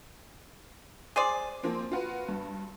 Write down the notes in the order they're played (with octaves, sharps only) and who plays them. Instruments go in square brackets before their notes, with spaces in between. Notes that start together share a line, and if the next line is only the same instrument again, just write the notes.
[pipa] G#4 C5 D5
[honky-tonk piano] F3 A#3 C4
F4 F#4 B4
G2